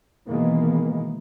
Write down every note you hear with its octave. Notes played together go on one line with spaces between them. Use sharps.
B2 D#3 E3 G#3 A#3 B3